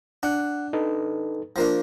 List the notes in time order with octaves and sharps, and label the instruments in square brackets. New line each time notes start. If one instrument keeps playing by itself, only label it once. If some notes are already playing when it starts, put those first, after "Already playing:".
[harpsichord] D4 [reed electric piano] F#5 F#6
[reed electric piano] D#4 A4 B4
[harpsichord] F3 A#3 D4